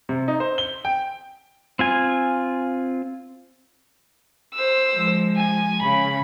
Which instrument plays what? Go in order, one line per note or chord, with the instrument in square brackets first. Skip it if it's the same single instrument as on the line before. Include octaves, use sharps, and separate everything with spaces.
[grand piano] C3
D#4
C5
G7
G5
[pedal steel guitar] C4 F4 G#5
[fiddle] C5 E6
[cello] F3 G#3
[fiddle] G#5
[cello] C#3 [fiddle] B5